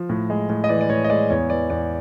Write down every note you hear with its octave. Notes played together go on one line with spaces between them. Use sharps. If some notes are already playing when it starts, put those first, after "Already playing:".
Already playing: F3
A2
G#3
A2
D#5
E3 D5
D5
A2 C#5
D#5
G#3 D5
E2 C#5
E3 D5
E2 D5